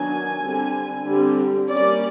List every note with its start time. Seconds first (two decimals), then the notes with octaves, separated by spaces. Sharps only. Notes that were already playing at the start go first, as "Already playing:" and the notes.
Already playing: D#3 F#3 B3 D4 G#5
0.41 D3 G3 C4
1.07 D3 G3 C4
1.71 G3 A#3 C#4 D5